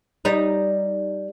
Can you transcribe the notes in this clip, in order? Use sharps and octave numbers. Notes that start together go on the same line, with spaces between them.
G3 D#4